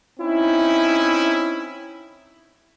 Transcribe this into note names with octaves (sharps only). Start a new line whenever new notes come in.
C4 C#4 D#4 E4